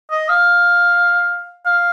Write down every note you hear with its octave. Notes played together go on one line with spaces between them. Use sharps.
D#5
F5
F5